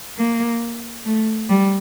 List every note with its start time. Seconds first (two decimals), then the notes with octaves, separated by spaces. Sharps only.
0.18 A#3
1.05 A3
1.49 G3